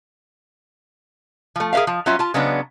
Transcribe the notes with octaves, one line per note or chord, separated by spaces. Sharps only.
F3 A3
G#4 A#4 C5 E5 F5
F3
F#3 C#4 F4 E5
F4 A5
C#3 F#3 G#3 B3 D4